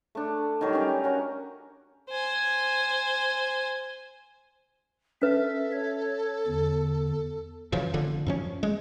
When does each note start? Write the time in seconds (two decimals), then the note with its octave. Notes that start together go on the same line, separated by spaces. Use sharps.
0.15 A3 D4
0.61 D#3 F#3 G3
0.73 C#4 G4
1.04 C#4 F#4 A#4
2.10 C5 G#5
5.22 C#4 A4 B4 E5
5.73 C#5
6.47 E2 D3
7.72 F#2 C#3 E3 F3
7.94 F1 D3 F3
8.27 F#2 F3 C#4
8.63 G#3